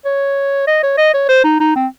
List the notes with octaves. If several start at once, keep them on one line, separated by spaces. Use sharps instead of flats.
C#5
D#5
C#5
D#5
C#5
C5
D#4
D#4
C4